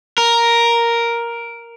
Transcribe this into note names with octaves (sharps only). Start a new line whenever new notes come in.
A#4